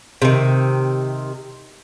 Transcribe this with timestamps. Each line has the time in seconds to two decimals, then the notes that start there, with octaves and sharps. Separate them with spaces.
0.22 C3 D#3